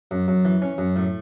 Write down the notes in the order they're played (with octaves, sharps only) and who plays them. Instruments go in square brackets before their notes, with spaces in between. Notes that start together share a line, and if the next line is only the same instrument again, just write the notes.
[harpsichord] F#2
F#2
E3
C#4
F#2
A2